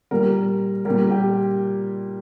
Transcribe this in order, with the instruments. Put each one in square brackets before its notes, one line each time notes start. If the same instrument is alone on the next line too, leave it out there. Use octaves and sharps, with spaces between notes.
[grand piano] A#2 G3 A#4
A#2 G3 A#4
G4